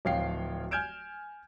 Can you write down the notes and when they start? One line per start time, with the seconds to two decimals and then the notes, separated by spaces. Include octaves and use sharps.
0.05 D1 F3 C#5 F5 G5 C7
0.71 G#5 F6 G6 G#6 D7 E7